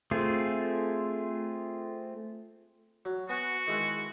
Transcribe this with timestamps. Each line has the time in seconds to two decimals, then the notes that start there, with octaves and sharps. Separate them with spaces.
0.11 A3 C4 F4 G#4
3.05 F#3
3.29 B3 F#4 G#5 C#6
3.67 D#3 G#3 E4